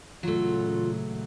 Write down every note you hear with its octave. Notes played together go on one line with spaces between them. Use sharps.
A#2 C#3 E3 F#3 A3 F4